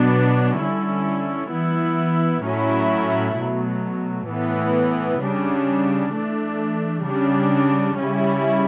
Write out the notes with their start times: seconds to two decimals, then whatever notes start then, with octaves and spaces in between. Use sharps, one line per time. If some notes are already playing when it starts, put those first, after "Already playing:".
Already playing: B2 F#3 B3 D4
0.59 D3 G3 C#4 E4
1.52 E3 B3 E4
2.44 A2 F#3 C#4 E4
3.37 B2 F#3 A3
4.29 A2 E3 B3
5.22 C#3 G3 D4
6.14 E3 A3 D4
7.06 C#3 G3 D4
7.98 C#3 G3 C#4 E4